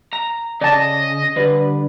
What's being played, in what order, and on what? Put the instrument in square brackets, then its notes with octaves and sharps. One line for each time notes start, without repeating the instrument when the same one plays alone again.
[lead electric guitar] A#5
[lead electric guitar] C#3 [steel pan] D5 A5 [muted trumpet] D#5
[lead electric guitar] D3 [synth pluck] G3 D4 B4